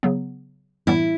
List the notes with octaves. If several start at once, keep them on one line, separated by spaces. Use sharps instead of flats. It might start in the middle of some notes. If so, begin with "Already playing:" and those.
C#3 F#3 B3
A2 E3 G3 B3 E4